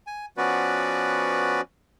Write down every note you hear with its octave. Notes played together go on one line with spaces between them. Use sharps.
G#5
F3 B3 C#4 F#4 B4 D5